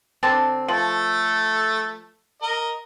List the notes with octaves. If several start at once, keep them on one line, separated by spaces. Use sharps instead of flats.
D3 C4 A5
F3 A3 A4
A#4 D#5